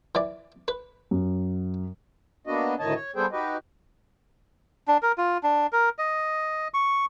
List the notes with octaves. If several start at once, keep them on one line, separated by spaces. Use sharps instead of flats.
E3 D5
B4
F#2
A#3 B3 D4 F#4 D#5
D2 A2 D#3 C#5 D#5 A5
C#5
G3 B3 G#4 A4 C5 G5
D#4 F#4 G4 B4 D#5
D4
A#4
F4
D4
A#4
D#5
C#6